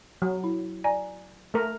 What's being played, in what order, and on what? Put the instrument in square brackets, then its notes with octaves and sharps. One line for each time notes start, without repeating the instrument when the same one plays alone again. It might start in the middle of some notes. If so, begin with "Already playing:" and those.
[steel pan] F#3
[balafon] E4
D5 G#5 A#5
[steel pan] A3 A#4